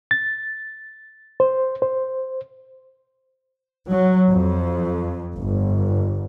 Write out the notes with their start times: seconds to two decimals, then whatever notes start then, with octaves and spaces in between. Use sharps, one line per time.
0.11 A6
1.40 C5
1.82 C5
3.89 F#3
4.31 F2
5.36 G1